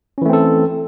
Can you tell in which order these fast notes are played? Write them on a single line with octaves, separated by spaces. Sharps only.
C#4 E3 A3 C4 A4